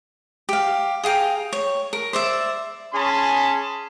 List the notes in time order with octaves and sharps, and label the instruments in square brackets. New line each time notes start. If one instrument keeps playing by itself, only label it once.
[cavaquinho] G4 F5
G#4 F5 G5 A#5
C#5
A#4
C5 D5 E5
[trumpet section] C#4 G#4 A5 B5 C6